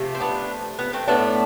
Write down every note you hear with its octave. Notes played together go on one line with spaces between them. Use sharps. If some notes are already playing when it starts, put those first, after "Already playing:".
Already playing: C3 F3 A3
C4
B3 D4
B3
A3 C4
A2 F3 A3 B3 D4